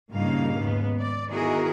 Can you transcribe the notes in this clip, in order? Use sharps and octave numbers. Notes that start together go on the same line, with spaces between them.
G2 A#2 C#3 A#3 D#4 F5
D#2 G#2 B3
D5
D#3 B3 E4 F#4 G#4 A#4